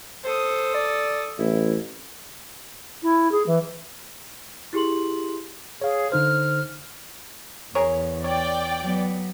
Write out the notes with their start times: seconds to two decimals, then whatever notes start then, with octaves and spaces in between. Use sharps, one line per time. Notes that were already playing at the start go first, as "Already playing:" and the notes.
0.25 A4 C5 D#6
0.74 D5
1.39 A1 E4
3.02 E4
3.31 G#4
3.46 E3
4.73 E4 G4 G#4 C6 F#7
5.81 G#4 C#5 F5
6.12 D3 D#4 C5 F6
7.75 E2 G#4 A#4 C#5
8.24 C#5 D5 G5
8.81 F#3 B3